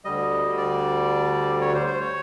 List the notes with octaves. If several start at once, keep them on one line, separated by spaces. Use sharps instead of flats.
D2 D3 G3 D#5
D5
C#5
C5
C5
C#5